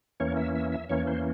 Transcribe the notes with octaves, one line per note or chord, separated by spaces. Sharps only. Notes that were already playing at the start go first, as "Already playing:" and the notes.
E2 E3 A#3 C#4 C#5
E5
E5
E5
E2 E3 A#3 C#4 C#5
C5